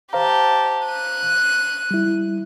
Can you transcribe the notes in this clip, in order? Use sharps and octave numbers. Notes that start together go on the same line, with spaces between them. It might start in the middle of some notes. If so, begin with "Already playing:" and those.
G4 C5 F5 A5 A#5
F#6 D#7
G3 E4